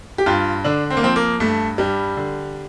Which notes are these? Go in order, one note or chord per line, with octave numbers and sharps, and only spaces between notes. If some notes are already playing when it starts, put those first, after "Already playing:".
G4
G2 F4
D3 D4
C4
A#3
F3 C4
A#3
G2 A3
G2 G3
D3